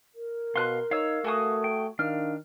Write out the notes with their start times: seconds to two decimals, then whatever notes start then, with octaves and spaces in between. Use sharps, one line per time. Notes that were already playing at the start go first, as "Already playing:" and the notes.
0.15 A#4
0.56 B2 F5 C6 F#6
0.91 D#4 C#5 F5 E6
1.24 A3 F#4 G#5 D#6
1.64 G5
1.99 D#3 D4 F5 F6